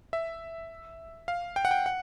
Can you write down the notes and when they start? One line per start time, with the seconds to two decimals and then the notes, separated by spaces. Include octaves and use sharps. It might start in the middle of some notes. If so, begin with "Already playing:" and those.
0.13 E5
1.28 F5
1.56 G5
1.65 F#5
1.71 G5
1.86 F#5